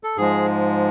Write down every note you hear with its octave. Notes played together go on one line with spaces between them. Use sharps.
A4
G#2 F3 G#3 G#4